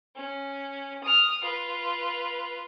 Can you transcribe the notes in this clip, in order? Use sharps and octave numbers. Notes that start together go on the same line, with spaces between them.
C#4
D#6 F6
F4 B4